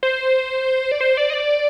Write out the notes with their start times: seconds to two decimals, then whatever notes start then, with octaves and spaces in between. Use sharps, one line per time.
0.03 C5
0.92 D5
1.01 C5
1.17 D5
1.30 D#5
1.34 D5